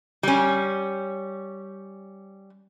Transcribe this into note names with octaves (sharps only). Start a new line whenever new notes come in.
G3 C#4